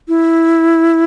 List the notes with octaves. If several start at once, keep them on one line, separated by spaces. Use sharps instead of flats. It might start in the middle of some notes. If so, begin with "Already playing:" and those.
E4